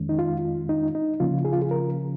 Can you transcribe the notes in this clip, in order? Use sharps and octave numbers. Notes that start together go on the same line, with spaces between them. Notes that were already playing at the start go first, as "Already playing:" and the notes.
Already playing: F2 D#3 G#3 C#4
D#4
F4
D#4
D#4
C#3 F3 A#3 C#4 F4
G#4
F4
G#4
A#4